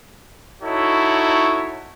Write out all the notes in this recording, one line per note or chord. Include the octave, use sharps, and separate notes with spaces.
D#4 E4 F#4 A4 C#5